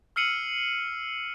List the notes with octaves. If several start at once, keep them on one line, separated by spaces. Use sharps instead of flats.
E6 F6 C7 C#7 D#7 F#7